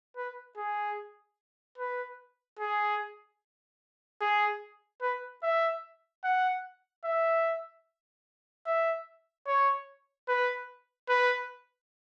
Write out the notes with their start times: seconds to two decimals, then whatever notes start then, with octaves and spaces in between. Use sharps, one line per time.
0.16 B4
0.57 G#4
1.78 B4
2.60 G#4
4.21 G#4
5.02 B4
5.43 E5
6.24 F#5
7.05 E5
8.66 E5
9.47 C#5
10.28 B4
11.09 B4